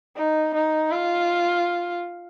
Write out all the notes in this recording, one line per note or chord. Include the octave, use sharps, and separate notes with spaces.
D#4
D#4
F4